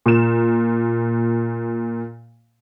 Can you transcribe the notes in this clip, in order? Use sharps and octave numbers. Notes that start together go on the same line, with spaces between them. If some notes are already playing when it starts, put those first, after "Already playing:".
A#2 E7